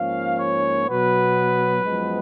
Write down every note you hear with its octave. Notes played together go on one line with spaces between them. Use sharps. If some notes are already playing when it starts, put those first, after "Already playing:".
Already playing: G#2 F3 A#3 C#4 F5
C#5
B2 F#3 B3 B4
F#2 F3 G#3 B3